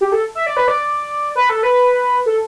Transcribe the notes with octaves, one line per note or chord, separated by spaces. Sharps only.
G4
A4
E5
D5
B4
D5
B4
A4
B4
A4